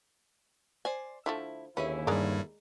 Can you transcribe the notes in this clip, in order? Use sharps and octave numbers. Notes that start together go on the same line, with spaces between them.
C5 D5 G#5
D3 F3 A3 E4
D#2 D3 C#4 E4 G#4 B4 E5
G2 G3 G#3 A#4 D5